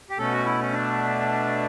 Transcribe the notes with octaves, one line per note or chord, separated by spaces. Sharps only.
G4
B2 A3 C#4 A4
F#4
E4
C#4
D4